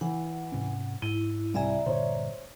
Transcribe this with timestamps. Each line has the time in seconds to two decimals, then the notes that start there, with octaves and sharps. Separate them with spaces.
0.01 E3 F#5
0.52 G#2 C3 C#4
1.02 G#2 E4 D#7
1.54 C2 E4 D5 E5 G#5 A#5
1.86 G2 A#2 D3 C5 C#5